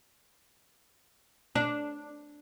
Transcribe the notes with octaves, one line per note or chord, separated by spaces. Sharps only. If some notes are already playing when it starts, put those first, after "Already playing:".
D4